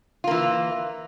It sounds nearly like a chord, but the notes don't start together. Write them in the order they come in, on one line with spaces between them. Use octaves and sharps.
F4 A#3 E3